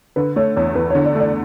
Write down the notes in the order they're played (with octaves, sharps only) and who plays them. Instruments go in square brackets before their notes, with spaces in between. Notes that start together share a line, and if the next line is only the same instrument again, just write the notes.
[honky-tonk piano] D3 [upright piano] B4
[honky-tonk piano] A3 [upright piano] C#5
[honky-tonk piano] E2 [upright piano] C#5
[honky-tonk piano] E2 [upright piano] B4
[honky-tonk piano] D3 [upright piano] C#5
[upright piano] D5
[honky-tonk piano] A3
[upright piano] D5